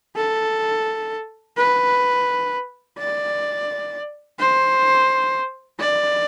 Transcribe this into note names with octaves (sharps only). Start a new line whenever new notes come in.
A4
B4
D5
C5
D5